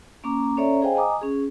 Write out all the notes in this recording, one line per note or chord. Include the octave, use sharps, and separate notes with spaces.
A#3 C#4 A#5 D6
C#4 A4 C#5 D5 E5 A#5
G#4 C5 D#5 F5 G5 G#5
D#5 G#5 A#5 D6 D#6
C#4 G#4